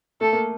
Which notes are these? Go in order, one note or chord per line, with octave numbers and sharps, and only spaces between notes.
A3 A4
A#3